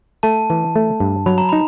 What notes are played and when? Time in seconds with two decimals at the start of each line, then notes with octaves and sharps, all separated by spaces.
0.23 A3 A5
0.50 E3
0.76 A3
1.00 G2
1.26 F#3 B5
1.38 A#5
1.49 D#4 B5